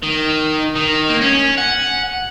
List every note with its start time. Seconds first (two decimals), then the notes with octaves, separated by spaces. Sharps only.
0.03 D#3
0.76 D#3
1.09 A#3
1.21 C#4
1.58 F#5